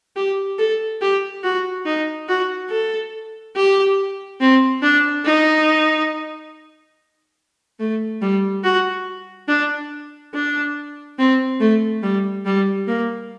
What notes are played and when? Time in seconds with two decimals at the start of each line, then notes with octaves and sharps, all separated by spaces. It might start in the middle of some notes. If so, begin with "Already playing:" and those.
0.16 G4
0.58 A4
1.01 G4
1.44 F#4
1.85 D#4
2.28 F#4
2.70 A4
3.56 G4
4.40 C4
4.82 D4
5.25 D#4
7.79 A3
8.22 G3
8.63 F#4
9.48 D4
10.34 D4
11.18 C4
11.59 A3
12.02 G3
12.45 G3
12.87 A#3